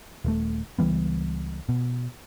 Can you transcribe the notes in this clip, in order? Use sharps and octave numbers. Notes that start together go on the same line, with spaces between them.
D#1 A3
C#2 E3 G3 B3
B2